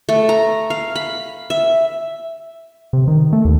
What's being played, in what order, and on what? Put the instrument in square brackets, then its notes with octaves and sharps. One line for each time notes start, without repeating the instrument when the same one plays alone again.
[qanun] A3
A#5
F5
B5
E5
[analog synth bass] C3
D#3
A3
D#2